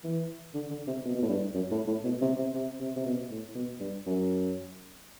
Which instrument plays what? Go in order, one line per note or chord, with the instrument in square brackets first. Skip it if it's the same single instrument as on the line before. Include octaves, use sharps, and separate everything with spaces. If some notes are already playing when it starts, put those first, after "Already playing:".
[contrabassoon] E3
D3
D3
C3
B2
B2
A2
G2
F#2
A2
A2
B2
C3
C3
C3
C3
C3
B2
A2
B2
G2
F#2